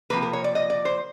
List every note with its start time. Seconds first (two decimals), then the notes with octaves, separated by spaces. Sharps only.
0.10 C3 F3 A#3 B4
0.22 A#4
0.33 C#5
0.44 D5
0.55 D#5
0.70 D5
0.85 C5